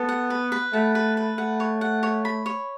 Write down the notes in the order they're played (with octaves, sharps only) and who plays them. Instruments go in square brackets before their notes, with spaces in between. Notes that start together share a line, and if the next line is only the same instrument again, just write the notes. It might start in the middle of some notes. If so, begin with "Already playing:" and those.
Already playing: [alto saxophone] B3 [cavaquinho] A4
[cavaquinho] F#5
B4
B4
[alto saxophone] A3 [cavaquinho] F#5
[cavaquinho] B4
B4
[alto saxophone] A3 [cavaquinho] F#5
[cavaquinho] C#5
F#5
C#5
B5
C#5